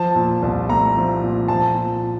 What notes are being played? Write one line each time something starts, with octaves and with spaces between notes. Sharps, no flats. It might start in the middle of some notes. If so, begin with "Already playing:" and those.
Already playing: F3 A5
A#2
C2
A3 A#5
F3
A#2
F3 A5
A#2